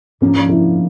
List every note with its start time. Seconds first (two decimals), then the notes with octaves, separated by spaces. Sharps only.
0.21 G#2 F3 A#3 C#4 D4 F4
0.49 E4